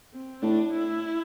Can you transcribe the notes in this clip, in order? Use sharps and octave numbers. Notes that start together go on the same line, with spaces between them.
C4
A2 D4
E4